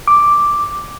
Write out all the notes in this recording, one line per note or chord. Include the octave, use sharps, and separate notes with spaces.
D6